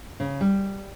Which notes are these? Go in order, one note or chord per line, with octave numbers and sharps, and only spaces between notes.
C#3
G3